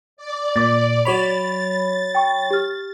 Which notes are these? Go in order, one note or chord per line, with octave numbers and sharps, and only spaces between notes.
D5
A#2 D6 A6
F#3 C#5 B5 A6 F7
G5 C#6
G4 F6